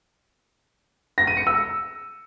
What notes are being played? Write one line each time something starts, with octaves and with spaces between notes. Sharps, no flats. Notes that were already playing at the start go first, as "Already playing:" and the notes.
A#6
D#7
C#7
E6